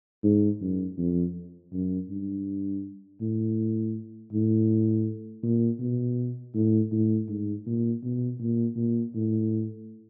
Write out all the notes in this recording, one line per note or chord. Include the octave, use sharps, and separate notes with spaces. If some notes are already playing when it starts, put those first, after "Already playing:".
G#2
F#2
F2
F#2
G2
A2
A2
A#2
B2
A2
A2
G#2
A#2
B2
A#2
A#2
A2